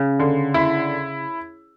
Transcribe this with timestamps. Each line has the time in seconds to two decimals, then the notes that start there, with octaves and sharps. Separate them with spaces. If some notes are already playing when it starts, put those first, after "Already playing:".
Already playing: C#3
0.19 D3
0.54 E4